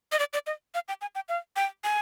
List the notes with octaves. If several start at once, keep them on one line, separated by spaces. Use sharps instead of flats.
D#5
D5
D5
D#5
F5
G5
G#5
G5
F5
G5
G#5